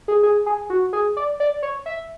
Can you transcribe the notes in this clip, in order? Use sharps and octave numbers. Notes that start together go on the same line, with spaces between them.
G#4
G#4
G#4
F#4
G#4
D5
D5
C#5
E5